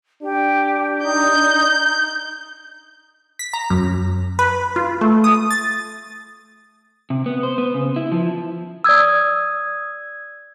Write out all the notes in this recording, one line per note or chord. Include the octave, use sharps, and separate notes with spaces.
D4 G4
D#4 G6
B6
A#5
F#2
B4
F4
A3
D#6
A6
C3
B3
C5
B3
C#3
E4
F3
D5 D#6 E6 G#6